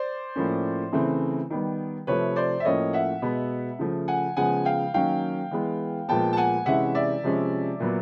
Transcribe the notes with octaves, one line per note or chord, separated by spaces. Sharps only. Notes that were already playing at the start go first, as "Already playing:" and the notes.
Already playing: C5 D5
A2 F3 A#3 C#4
C#3 E3 A3 C4
D#3 G3 B3
C3 F3 A3 B4 C#5
C5 D5
E5
A2 F3 A#3 C#4 C#5 D#5
E5 F#5
B2 G#3 B3
C#3 F3 A3
F#5 G#5
C#3 F3 G#3 B3 F#5 G#5
F5 G5
D#3 F#3 A#3 C#4 F5 G5
E3 G#3 B3
A#2 F3 G#3 B3 G5 A5
A5
F#5 G#5
C3 E3 G#3 C#4 E5 F#5
D5 E5
C3 F3 G#3 C#4
A#2 F#3 B3